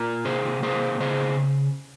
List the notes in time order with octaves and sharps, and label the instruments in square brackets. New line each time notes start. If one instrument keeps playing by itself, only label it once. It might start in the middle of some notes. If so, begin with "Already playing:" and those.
Already playing: [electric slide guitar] A#3 F4
C3 G#4 C5
A#3 G#4 C5
C#3 G#4 C5